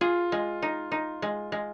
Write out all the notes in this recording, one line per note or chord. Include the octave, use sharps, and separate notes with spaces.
F4 G#4
G#3
D#4
D#4
G#3
G#3